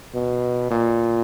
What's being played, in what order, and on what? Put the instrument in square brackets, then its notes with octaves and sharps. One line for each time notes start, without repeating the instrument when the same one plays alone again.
[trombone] B2
A#2